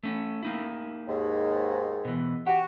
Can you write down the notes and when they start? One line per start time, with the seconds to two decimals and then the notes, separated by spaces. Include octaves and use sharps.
0.03 A3 C#4
0.43 A#3 D#4 E4
1.08 D#2 G#2
2.05 B2 E3
2.46 F#4 G4